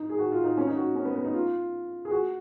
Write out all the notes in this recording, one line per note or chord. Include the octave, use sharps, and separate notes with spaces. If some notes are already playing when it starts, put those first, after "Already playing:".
Already playing: D#4
G#4
F#4
F4
D#4
C#4
D#4
F#4
C#4
B3
B3
D#4
F4
G#4
F#4